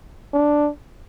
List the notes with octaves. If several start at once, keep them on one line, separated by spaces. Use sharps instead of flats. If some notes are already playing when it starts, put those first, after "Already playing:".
D4